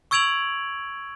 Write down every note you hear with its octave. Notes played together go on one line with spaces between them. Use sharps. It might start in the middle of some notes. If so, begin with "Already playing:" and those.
C#6 E6 G#6 D7 F7 F#7